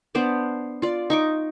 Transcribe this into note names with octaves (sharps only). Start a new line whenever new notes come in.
B3 D4 C5 D5
F4 D5
D#4 C#6 D6